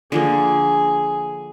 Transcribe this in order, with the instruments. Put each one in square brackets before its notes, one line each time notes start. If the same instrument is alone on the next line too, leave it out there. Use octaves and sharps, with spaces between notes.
[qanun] D3 F3 A#3 [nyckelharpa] G#4